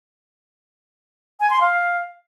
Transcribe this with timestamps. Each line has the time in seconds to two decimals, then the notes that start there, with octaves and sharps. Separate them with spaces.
1.40 G#5
1.50 C6
1.61 F5